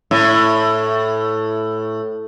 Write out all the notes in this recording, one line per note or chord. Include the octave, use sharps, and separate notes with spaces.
A2